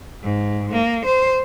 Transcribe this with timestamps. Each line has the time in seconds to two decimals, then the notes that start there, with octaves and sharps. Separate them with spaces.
0.23 G#2
0.72 A#3
1.05 C5